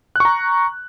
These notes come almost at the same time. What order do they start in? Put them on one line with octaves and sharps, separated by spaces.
F#6 C#6 A#5